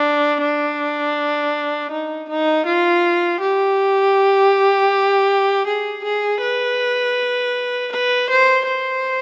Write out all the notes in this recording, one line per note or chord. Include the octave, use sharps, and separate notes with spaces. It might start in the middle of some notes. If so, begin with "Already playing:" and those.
Already playing: D4
D4
D#4
D#4
F4
G4
G#4
G#4
B4
B4
C5
C5